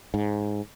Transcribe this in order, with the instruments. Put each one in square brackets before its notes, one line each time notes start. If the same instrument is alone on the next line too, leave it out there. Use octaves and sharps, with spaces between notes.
[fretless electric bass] G#2